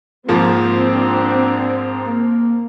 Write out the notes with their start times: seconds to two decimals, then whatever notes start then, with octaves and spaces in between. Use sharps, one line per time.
0.29 G#2 F3 A#3 C4 F4
0.94 D4
2.06 A#3